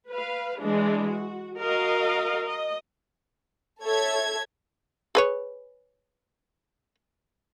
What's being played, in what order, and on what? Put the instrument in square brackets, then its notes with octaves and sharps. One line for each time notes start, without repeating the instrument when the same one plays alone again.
[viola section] B4 F5
E3 G#3 D4
F#4
F#4 A#4 D#5 F5
D#5
[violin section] A4 C#5 E5 G#6
[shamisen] G#4 B4 C#5